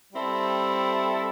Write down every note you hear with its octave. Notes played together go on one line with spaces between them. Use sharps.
G3 C4 E4 A4